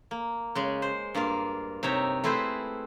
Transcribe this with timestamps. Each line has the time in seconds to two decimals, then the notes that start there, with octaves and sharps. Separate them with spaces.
0.11 A#3
0.55 C#3 G#3
0.82 C5
1.15 G2 A#3 F4 A#4
1.83 C3 D#4 C#5 E5 A#5
2.24 A3 C4 E4 G#4 B4 C5